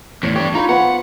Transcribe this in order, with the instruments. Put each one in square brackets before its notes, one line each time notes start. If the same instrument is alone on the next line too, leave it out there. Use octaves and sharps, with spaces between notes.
[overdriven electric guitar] E2 A2 [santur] C#5
[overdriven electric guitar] D4 G4 [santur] C#5
[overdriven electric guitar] D#4 A#5 [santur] F4 B5
[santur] B3 C5 B5 [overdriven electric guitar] F#5